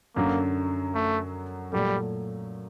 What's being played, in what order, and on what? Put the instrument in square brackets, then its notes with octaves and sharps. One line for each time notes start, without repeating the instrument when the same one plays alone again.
[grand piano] F#2 D3 F#3 [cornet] A#3
[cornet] A3
[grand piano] A#2 F#3 A3 [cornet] G3